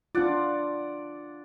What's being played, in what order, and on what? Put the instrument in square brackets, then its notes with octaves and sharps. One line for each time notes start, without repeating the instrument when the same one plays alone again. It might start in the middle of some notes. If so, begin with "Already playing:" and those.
[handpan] D4 F4 [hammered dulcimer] D5 F#5